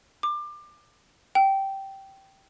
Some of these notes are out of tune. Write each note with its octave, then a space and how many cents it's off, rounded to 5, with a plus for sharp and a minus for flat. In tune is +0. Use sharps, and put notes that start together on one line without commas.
D6 +25
G5 -10